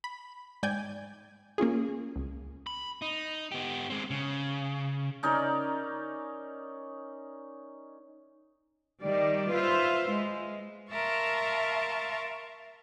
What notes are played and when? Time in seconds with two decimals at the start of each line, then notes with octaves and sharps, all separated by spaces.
0.04 B5
0.63 G#2 D5 G5 G#5 G6 G#6
1.58 A#3 C#4 F4 G#4
2.16 C#2
2.67 B5
3.02 D#4
3.52 B3 G4
3.90 G#3 C4
4.11 C#3
5.23 C#4 D#4 A#4 D5
9.02 D#3 G3 D5
9.50 F4 B4 C5 E5
10.10 G#3
10.90 A#4 E5 F5 A5 C6 C#6